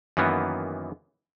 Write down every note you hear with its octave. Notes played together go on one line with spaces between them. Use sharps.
F#2 D#3 E3 A#3 B3